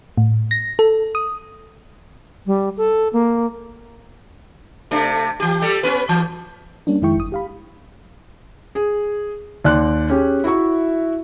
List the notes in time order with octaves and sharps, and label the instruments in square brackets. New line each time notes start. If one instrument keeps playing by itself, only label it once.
[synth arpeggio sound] A2
A#6
A4
D#6
[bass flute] G3
A4
A#3
[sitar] C3 A3 D4
E3 G4
G3 G4 A4
B3 C#4 B4
E3
[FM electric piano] G3 A#3 C#4 D4
F2 D#3 G#3 E4 G5 C#6
G1 D#6
G4 F5 B5
[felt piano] G#4
D#2 D5 C6 F#6
C#4 G4 G#4
E4 F#4 E5 C#6